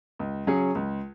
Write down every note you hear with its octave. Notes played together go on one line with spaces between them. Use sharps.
C#2
C#3 F#3 C#4 G#4
C#2